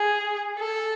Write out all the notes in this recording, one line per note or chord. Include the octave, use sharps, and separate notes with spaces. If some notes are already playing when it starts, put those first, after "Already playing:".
Already playing: G#4
A4